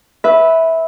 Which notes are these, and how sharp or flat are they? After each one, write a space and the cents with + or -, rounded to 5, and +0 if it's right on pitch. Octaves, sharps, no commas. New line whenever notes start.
B4 +0 E5 -15